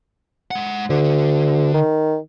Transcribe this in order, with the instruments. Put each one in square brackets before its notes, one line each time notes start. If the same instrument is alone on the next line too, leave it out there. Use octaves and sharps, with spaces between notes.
[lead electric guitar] G#3 F#5
[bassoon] D2 [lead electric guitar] D3
[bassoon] D#3